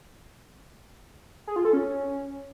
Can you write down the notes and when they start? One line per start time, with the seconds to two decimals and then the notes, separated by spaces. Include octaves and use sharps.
1.47 G#4
1.56 F4
1.65 A4
1.73 C#4